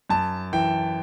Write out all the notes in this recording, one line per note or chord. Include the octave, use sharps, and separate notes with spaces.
F#2 A5
E3 G5